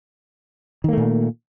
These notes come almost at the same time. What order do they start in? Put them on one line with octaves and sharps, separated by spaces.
D#3 A#3 A3 A#2